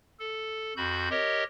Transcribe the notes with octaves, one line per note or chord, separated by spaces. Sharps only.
A4
F2 F#4 B5 G6
G4 A#4 C#5 D#5